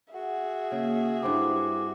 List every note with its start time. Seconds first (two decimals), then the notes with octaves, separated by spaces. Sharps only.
0.14 F#4 G#4 E5 F#5
0.72 C#3 A#3
1.22 G2 C4 E4 B4 D6